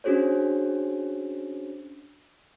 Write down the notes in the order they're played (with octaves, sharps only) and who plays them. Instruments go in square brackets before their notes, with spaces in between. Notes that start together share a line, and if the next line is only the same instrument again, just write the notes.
[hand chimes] C#4 D4 F#4 G#4 C5 C#5